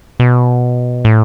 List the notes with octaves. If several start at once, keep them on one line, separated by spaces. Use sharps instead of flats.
B2
A2